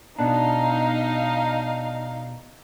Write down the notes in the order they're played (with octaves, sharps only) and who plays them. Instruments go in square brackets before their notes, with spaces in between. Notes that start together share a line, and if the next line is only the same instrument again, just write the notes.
[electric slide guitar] B2 B3 D4 [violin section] D#4 F5